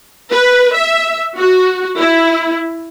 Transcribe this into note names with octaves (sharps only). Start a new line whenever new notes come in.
B4
E5
F#4
E4